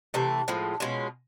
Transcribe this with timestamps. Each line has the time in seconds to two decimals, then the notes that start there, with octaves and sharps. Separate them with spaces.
0.14 C3 E3 A3
0.48 A2 F3 G#3
0.80 B2 G#3 C#4 F4